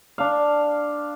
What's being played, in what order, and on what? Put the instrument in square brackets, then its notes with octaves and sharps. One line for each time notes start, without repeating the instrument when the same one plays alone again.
[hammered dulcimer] D4 F5